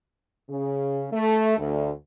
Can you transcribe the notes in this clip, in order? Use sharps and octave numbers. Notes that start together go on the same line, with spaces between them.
C#3
A3
D2